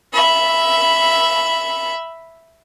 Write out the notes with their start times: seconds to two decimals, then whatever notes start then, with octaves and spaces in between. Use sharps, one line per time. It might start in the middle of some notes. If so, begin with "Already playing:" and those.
0.14 E5 B5